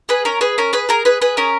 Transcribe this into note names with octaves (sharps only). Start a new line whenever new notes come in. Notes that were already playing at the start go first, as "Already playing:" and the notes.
G#4 B4
C#4 A#4
G#4 B4
C#4 A#4
G#4 B4
G#4 A#4
G#4 B4
G#4 B4
C#4 A#4